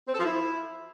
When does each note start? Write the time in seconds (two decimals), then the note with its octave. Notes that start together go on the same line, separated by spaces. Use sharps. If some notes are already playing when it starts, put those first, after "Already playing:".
0.08 C4
0.14 A4
0.19 F3
0.25 E4